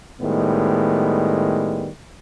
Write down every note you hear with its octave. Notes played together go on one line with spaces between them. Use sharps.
A2 D#3 G3 G#3 B3